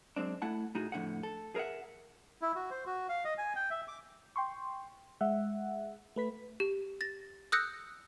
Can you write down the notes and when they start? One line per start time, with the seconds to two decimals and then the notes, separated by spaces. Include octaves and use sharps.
0.16 F#2 G#3 C4 D4
0.42 A3 E4 F#5 A5
0.75 A2 D#4 F#4 G#4
0.92 F2 A2 D3 F#5
1.23 A4
1.55 G#4 A#4 B4 E5 F#5
2.41 E4
2.56 F#4
2.71 C5
2.86 F#4
3.09 F5
3.25 D#5
3.38 G#5
3.56 G5
3.70 E5
3.88 D6
4.36 G5 C6 C#6
5.21 G#3 E5 F#5
6.16 A3 B4 B6
6.60 G4
7.01 A6 A#6
7.52 D#6 E6 F#6 G6 A#6 C#7